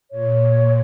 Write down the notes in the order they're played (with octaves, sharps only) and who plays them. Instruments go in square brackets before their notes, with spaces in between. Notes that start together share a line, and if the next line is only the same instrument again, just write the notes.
[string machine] A#2 [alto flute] C#5